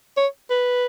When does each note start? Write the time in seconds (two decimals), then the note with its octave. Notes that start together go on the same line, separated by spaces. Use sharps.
0.17 C#5
0.50 B4